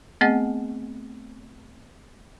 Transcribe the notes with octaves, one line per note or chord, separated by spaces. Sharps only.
A3 B3 C4 G#4 D#5 F#5